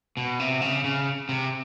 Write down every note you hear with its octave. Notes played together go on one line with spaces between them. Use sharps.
B2
C3
C#3
C#3
C3